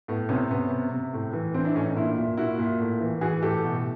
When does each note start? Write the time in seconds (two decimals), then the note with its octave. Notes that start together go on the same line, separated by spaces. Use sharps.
0.08 A2 B3
0.29 C3 B3 C#4
0.51 C3 B3 C#4
0.71 C3
0.91 C3
1.13 A2
1.33 E3
1.54 E3 C4 D4
1.65 D4 E4
1.75 A2 C#4 D#4
1.86 C#4 D#4
1.96 A#2 D4 E4
2.18 A#2
2.37 A#2 E4 F#4
2.59 A#2
2.80 A2
3.00 E3
3.21 E3 F#4 G#4
3.42 A2 G4 A4
3.63 B2